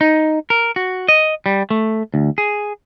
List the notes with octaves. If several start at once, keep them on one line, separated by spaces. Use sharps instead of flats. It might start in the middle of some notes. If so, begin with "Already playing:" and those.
D#4
A#4
F#4
D#5
G3
A3
D2
G#4